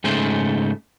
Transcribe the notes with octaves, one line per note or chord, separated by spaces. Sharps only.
G#2 C#3 A3 A4 C5